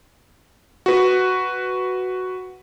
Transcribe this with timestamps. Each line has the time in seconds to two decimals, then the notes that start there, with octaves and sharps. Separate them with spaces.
0.86 F#4 B4